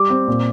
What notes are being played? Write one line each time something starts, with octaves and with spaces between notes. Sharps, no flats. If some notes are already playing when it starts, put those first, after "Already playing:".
Already playing: G3 D6
C4
A#2